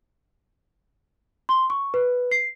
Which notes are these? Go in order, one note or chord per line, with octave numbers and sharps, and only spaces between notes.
C6
C#6
B4
C7